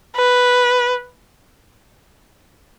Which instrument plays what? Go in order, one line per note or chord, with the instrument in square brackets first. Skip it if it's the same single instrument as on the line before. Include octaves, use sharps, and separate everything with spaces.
[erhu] B4